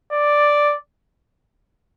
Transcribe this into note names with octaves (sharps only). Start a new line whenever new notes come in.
D5